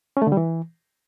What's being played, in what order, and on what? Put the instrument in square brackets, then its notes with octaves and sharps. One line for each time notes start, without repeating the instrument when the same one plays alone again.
[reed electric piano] C#4
A3
D3
G3
E3